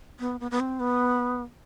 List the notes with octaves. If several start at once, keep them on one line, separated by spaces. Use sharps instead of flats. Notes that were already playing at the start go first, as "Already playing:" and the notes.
B3
B3
B3
C4
B3